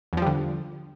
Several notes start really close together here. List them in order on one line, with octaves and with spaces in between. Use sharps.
E2 F3 G3 D3